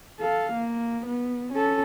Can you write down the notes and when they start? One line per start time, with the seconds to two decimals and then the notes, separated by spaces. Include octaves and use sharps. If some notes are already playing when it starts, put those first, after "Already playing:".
0.20 A4 F5
0.53 A#3
1.06 B3
1.53 C#4 A4